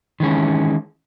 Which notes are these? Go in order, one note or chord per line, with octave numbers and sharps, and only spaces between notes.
D#3 E3 G#3 C#4